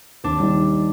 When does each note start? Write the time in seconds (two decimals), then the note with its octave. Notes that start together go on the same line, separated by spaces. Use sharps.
0.24 D#2 D4
0.40 D#3 G3